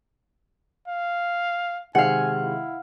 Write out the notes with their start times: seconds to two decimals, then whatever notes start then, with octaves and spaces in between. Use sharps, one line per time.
0.88 F5
1.95 C3 D#3 G#3 F5 F#5 G#5
2.42 E4